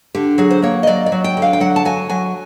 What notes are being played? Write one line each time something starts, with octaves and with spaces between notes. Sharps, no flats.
D3 G4
F#3 G#4
C5
A#3 C#5
D#5
F#3 D5
D5
F#3
G5
D3
F5
G5
F#3 F#5
A5
F#3 G#5
F#3 G#5